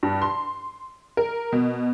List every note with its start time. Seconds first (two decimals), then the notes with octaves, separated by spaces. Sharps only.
0.03 G2
0.22 C6
1.17 A#4
1.53 B2